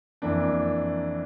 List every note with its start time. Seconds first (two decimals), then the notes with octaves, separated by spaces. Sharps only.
0.22 F2 E3 A#3 D4